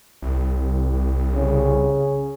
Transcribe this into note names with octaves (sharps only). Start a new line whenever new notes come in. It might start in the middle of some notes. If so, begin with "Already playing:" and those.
C2
C2
C#3